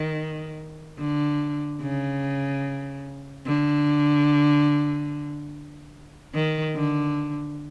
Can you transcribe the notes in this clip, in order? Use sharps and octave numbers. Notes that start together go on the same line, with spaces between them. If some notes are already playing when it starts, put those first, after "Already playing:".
Already playing: D#3
D3
C#3
D3
D#3
D3